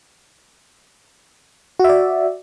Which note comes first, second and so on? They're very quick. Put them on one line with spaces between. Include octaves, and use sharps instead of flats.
F#4 E5 D5